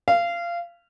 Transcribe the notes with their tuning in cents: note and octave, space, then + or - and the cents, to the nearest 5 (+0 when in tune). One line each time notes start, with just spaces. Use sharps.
F5 -20